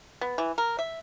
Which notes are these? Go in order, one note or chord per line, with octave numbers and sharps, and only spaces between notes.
B3
E3
A#4
E5